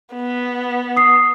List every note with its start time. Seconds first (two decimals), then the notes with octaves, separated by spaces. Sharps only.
0.15 B3
0.97 D#6 C7